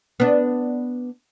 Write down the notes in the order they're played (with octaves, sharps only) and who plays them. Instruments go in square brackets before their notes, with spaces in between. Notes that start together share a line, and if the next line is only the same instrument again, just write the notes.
[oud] B3 D4